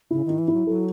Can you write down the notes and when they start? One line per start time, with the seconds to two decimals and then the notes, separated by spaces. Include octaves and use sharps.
0.11 C#3 E4
0.25 D#3 E4
0.38 E3
0.48 E4
0.53 F#3
0.67 F#3 A4